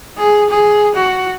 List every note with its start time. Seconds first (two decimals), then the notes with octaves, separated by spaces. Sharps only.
0.18 G#4
0.50 G#4
0.95 F#4